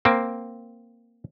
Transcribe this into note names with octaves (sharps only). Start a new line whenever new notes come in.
A#3 C4